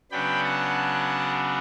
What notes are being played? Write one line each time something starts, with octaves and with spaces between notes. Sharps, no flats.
C#3 F#3 B3 D4 G5 B5
F#5 A5